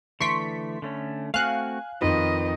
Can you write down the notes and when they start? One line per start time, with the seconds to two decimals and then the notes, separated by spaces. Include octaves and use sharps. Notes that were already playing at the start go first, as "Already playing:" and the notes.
0.20 D3 E3 A3 C6 C#6 B6 C#7 D7
0.82 D3 A3 C#4
1.34 A3 C4 F#4 F5 G#5 F#6
2.02 F2 D#3 F3 B4 D#5